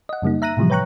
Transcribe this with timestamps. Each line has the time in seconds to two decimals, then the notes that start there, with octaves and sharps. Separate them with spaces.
0.09 D#5 F#5
0.22 F#2 C#3 G3 A#3 D#4
0.42 E5 A#5 F#6 A#6 D#7
0.57 A2 C3 E3 F3 G3
0.70 B4 C#5 G5 A#5 C#6 F#6